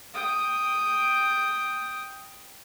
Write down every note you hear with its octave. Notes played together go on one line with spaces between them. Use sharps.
G5 D#6